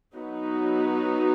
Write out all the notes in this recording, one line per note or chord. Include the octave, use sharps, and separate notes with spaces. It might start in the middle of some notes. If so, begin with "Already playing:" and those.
F#3 B3 D#4 F#4 B4